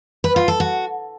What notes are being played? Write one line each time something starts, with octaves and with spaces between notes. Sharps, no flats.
B4
F4
A4
F#4